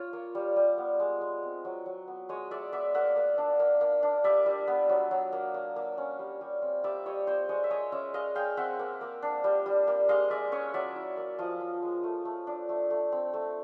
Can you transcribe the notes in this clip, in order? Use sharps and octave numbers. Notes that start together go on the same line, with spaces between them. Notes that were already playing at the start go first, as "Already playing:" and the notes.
Already playing: F4 C#5
A#3
G3
G3
B3
G#3
G#3
C4
F#3
F#3
B3
G#3 C#5 D#5
G#3 D5 E5
B3 D5 E5
A#3 E5 F#5
A#3
D4
A#3
A#3
D4
G3 D5 E5
G3
B3
F#3
F#3
A#3
A#3
A#3
C#4
G3
G3
C4
G3 D5 E5
G3 C#5 D#5
C4 C5 D5
G#3 C#5 D#5
E5
G#3 C#5 D#5
C#4 D5 E5
G#3 D#5 F5
G#3 F5 G5
C4 E5 F#5
A#3
A#3
D4
G3
G3
A#3
G#3 D#5 F5
G#3 D5 E5
C#4 C#5 D#5
F#3 D5 E5
E4
A#3
F3 D#5 F5
F3
G#3
A3
A3
D4
A3
A3
C4
A3